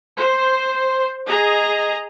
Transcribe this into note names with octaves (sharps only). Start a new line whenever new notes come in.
C5
G#4 D#5 A#5